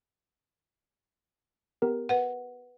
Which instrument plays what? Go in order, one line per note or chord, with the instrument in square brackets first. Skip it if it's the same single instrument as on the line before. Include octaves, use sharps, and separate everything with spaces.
[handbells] B3 G4 A#4
[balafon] B4 F#5